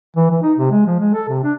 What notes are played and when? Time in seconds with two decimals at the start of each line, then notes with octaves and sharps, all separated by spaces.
0.16 E3
0.31 E3
0.43 D#4
0.58 C3
0.71 G#3
0.87 F3
1.00 G#3
1.14 A4
1.29 C3
1.44 D4